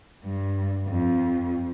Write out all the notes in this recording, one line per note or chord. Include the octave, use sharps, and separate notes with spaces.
G2
F2